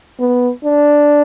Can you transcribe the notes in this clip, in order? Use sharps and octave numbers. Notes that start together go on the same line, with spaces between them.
B3
D4